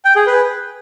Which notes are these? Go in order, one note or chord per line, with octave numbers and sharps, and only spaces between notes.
G5
G#4
B4